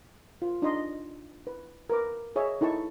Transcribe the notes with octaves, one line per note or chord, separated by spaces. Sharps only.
F4
D4 D#4 D#5 C6
B4
A#4 B4 D6
G#4 C#5 D#5 E5
D#4 E4 A4 A5 C#6